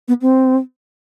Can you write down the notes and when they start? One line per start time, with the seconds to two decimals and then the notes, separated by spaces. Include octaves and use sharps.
0.08 B3
0.22 C4